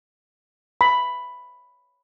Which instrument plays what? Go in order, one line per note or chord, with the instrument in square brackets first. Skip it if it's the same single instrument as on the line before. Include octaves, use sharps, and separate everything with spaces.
[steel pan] B5